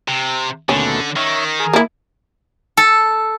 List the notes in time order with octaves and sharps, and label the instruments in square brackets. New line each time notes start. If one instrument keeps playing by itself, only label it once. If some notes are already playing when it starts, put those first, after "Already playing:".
[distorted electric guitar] C3
[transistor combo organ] D#2 B2 A3 [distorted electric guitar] D3 [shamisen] C#4
[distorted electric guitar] D#3 [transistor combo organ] C#5 E5
[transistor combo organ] G#4 A#4
[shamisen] A#3 E4
[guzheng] A4